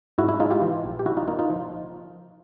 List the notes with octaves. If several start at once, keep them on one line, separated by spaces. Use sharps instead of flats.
G#2 E4 F#4
E4
G#3 D#4 F4
F4 G4
E3
A#1
G4
D3 E4 F#4
D#4 F4
A#3 D#4 F4
D#4 F4
F3